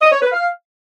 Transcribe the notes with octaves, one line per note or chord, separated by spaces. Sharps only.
D#5
C#5
B4
F5